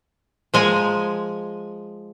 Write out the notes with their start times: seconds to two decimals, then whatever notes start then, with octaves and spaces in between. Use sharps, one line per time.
0.54 F3 G#3 G#5 A#5